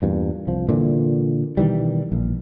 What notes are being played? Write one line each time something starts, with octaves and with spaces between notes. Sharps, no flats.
E2 G2 A#2
C2 F3
A#2 D3 E3
B2 D#3 E3 G3
A#1